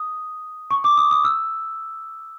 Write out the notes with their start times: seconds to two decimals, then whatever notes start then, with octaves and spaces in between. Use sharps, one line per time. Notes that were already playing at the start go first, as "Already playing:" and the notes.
Already playing: D#6
0.71 C#6
0.84 D6
0.97 D#6
1.11 D#6
1.24 E6